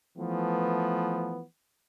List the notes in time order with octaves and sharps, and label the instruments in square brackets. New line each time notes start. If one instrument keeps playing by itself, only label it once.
[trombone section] E3 F3 A3 B3